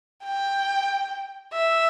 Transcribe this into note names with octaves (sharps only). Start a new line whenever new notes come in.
G5
E5